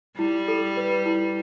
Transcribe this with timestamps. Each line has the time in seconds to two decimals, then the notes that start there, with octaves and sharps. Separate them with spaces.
0.18 G3 E4
0.48 A4
0.77 B4
1.06 E4